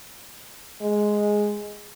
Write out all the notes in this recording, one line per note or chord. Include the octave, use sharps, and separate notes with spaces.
G#3